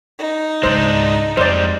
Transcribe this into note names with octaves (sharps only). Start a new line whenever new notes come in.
D#4
C#2 G#2 G#3 D4 C5
F2 G3 G#3 C5 D5